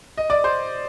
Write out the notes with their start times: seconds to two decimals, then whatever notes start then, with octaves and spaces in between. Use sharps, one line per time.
0.17 D#5
0.30 D5
0.44 C5